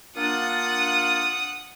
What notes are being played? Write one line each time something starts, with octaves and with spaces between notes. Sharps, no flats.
A#3 D4 F4 F#5 D#6